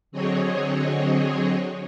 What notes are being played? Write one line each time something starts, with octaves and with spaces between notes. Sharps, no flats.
D3 F#3 C4 G#4 C#5 D#5